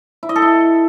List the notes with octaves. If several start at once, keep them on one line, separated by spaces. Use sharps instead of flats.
E4
D#5
A4
E4